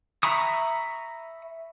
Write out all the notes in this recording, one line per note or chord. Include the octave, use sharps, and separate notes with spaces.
E5 A#5 B5 C#6 D#6